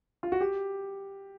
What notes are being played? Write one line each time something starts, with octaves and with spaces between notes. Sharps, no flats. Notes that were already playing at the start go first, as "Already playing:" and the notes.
F4
F#4
G4